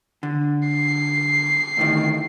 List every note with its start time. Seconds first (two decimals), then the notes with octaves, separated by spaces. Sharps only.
0.23 D3
0.68 C7
1.77 D2 A2 D#3